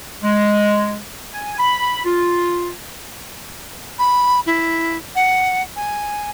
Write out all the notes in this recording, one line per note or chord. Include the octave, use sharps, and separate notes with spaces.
G#3
G#5
B5
F4
B5
E4
F#5
G#5